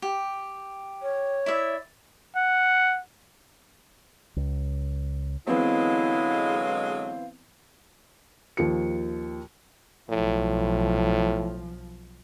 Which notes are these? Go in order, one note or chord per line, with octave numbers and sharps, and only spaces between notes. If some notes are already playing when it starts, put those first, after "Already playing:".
G4
C#5
E4 D5 E5
F#5
C#2
D3 E3 F#3 G#3 B3 C4 E4 F5
D#2 F3 C#7
B1 A2 F3